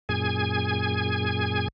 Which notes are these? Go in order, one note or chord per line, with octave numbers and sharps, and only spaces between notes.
F#2 A#2 G#4 G#5 G#6